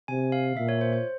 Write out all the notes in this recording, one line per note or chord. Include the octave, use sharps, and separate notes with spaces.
C3 G#5
F5
A#2 E5
C#5
C5
C5